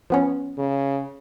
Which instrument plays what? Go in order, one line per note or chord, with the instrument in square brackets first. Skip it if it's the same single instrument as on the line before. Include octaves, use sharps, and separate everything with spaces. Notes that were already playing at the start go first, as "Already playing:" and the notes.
[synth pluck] F3 B3 C#4
[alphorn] C#3